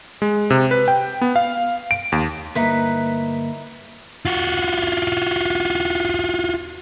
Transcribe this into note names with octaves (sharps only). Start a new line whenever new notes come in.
G#3
C3
B4
G5
B3
F5
D7
D#2
D2 G2 A#3 D#4 E4 B4
F4 F#4